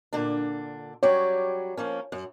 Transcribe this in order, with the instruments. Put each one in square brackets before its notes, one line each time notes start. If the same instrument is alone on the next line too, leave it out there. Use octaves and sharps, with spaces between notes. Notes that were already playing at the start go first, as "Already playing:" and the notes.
[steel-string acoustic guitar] A#2 D3 D4
[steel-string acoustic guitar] F#3 G3 G4 [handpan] C#5
[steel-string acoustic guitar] F3 A#3 C#4
F#2